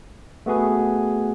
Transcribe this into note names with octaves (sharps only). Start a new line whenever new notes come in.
A3 B3 F#4 G#4 B4